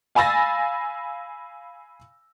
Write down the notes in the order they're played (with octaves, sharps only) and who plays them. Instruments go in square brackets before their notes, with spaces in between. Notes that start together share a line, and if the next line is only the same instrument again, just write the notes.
[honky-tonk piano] F5 G#5 B5 E6 A6 A#6